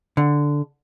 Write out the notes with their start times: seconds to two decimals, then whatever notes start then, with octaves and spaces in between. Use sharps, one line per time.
0.17 D3